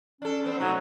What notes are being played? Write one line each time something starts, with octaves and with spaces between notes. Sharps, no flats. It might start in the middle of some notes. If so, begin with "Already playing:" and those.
C#4 D4 A4
B3 C4 D4
C3 F#3 A3 D#4